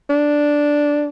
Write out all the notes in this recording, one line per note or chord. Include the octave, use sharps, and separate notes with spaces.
D4